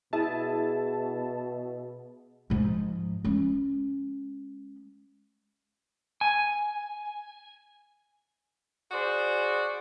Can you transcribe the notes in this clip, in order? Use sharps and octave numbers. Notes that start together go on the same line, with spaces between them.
B2 E4 G#4 A5
G#2 F3
G#3 C#4
G#5
F#4 G#4 C5 D5